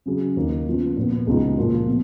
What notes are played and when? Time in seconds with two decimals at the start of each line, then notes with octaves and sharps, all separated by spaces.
0.06 C#3 F#3 C#4 G#4
0.36 D#2 D#3 A#3 D#4
0.66 C#3 F3 B3
0.97 A#2 F3 B3
1.27 C#2 B2 G#3 D#4 G#4
1.57 A#2 F3 A#3 F4
1.88 B2